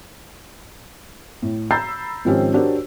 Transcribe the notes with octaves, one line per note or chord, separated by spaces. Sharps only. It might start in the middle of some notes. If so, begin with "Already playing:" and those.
A2
A#5 B5 E6 G6 A6 C7
G#2 D#3 F3 C4 C#4 G4
D4 F#4 G4 A#4 C5 C#5